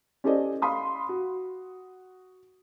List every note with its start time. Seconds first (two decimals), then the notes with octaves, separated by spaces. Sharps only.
0.24 C#4 G4 A4 C5 D5 D#5
0.62 F5 B5 C6 D#6
1.09 F#4